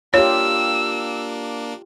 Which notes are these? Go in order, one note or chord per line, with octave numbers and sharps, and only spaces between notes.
A#3 D4 F4 G4 C#5 E6